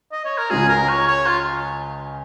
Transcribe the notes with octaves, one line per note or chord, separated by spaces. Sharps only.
D#5
C#5
A#4
C#2 C#3 G#3 F4 G#4
A#4
C#5
C#5
F4